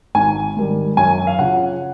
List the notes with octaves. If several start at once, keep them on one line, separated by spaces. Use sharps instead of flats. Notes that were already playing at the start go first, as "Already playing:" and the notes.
G#1 G#5
G#2 D#3 G3
F#2 G#5
F5
C#3 F3 F#5